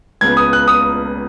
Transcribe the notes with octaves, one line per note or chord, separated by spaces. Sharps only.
C#2 C#3 B3 G#6
D#6
F#6
D#6